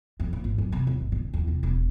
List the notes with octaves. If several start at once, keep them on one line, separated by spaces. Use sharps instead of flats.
F2
A#2
G#1
F#2
C3
D#2
G#1
D3
E2
C3
E1